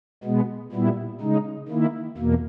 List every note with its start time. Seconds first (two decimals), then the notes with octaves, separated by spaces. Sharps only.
0.23 B2 G#3 B3
0.72 A#2 G3 B3 E4
1.21 C#3 G#3 D#4
1.69 D#3 A#3 E4
2.18 E2 B2 A#3